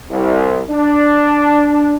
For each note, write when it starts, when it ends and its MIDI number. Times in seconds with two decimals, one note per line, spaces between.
0.11 0.62 36
0.71 1.97 62